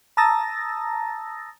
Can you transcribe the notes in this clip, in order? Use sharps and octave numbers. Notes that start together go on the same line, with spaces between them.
A5 A#5 D#6 E6 A6 A#6